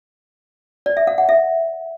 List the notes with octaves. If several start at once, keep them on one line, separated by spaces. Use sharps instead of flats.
D5
E5
F5
F#5
E5